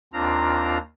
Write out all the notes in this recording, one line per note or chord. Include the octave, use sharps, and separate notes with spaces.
D#2 C4 D4 F4 A#5